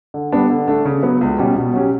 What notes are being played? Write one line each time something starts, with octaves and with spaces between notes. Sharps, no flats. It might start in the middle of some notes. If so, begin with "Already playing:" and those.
D3
G3 B3 D4
D3
A3 D4
C#3
F#3 B3
C#2
B2 G3 C#4 G4
B2
F#3 C#4 G4